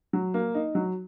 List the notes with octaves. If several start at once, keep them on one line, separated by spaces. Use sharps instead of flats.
F#3
A#3
D#4
F#3